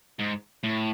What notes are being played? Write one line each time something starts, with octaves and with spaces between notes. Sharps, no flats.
G#2
A2